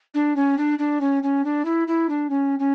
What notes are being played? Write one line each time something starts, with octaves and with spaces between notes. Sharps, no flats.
D4
C#4
D4
D4
C#4
C#4
D4
E4
E4
D4
C#4
C#4